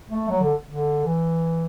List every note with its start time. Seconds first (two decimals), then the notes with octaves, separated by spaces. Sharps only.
0.09 A3
0.29 F#3
0.41 D3
0.67 D3
1.05 E3